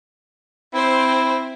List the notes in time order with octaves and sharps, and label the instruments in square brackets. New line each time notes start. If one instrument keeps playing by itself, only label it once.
[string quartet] C4 C5 [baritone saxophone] E4